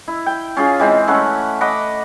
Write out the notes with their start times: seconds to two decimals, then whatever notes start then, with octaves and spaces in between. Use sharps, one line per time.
0.08 E4
0.26 G5
0.57 C#4 F4 G#4
0.80 E3 G#3 C4
1.07 A3 C#4 B4 F#5
1.61 D#5 F#5 B5 D6